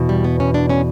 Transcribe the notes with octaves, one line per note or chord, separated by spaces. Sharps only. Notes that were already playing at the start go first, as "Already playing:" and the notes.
Already playing: E2 B2
G3
B3
C#4
D4
C#4